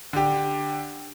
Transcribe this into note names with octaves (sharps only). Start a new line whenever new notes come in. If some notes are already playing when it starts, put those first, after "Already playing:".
D3 G4